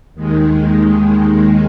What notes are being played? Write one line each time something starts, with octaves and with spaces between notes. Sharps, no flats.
D#2 D#3 G#3